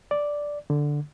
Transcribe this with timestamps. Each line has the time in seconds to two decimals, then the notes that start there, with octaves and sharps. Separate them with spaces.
0.11 D5
0.70 D3